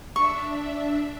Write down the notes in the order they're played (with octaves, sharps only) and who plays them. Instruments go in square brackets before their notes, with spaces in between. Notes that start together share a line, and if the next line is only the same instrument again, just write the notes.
[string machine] D4 E5 [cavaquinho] C#6